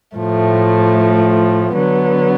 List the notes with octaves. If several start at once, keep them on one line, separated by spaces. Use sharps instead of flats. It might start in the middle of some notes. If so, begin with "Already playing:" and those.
A2 F3 A3
D3 F#3 B3